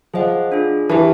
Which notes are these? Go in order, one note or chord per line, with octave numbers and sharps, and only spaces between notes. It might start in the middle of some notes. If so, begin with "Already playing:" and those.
F3 G#4 C5 D#5 F#5
D4 F4 G#4
E3 G4 B4 E5 A5